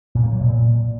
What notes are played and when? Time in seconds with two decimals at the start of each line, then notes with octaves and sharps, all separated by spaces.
0.15 A#2
0.23 A#3
0.32 F#3
0.40 B2
0.49 A#2